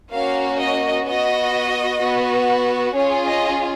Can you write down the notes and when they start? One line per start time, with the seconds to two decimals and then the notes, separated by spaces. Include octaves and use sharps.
0.11 A#3 C#4 F#4 F5
0.59 D#5
1.06 B3 F#4 D#5
2.00 B3 F#4
2.94 C#4 F4 G#4 C#5
3.25 D#5